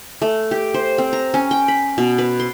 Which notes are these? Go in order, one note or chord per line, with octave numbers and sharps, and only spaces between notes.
A3
G4
C5
C4
A#5
C#4
G5
B5
B2
B4
C6